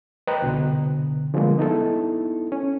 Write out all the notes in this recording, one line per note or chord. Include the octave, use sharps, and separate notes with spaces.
B4 C5 D#5 G5 A#5 F#6
C2 B2 D3
D3 F3 G3 G#3 A#3 B3
B3 D#4 E4 A4
C#4